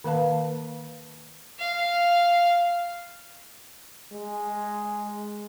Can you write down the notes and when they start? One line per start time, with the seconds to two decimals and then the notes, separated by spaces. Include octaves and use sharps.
0.04 D#3 A#3 B4 F5 A5
1.59 F5
4.12 G#3